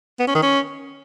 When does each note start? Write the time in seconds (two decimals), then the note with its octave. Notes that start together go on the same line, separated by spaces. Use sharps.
0.20 B3
0.27 C#4
0.35 D#3
0.43 C#4